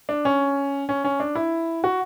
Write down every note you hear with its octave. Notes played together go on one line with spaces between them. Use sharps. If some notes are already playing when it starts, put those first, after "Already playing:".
D4
C#4
C#4
C#4
D4
E4
F#4